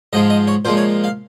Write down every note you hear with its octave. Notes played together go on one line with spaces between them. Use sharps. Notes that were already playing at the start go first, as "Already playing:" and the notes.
G#2 F3 G#3 D#5
D#5
C#5
A#2 F3 G#3 C5
C#5
F5